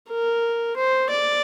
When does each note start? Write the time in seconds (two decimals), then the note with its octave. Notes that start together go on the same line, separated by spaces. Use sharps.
0.10 A#4
0.77 C5
1.10 D5